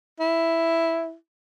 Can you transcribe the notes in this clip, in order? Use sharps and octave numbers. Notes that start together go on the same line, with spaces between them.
E4